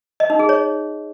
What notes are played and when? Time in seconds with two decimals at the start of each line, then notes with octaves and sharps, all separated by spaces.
0.20 D#5
0.30 D#4
0.39 G#4
0.49 C#5